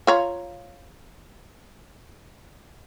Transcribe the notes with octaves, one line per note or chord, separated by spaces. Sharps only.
F4 C#5 A#5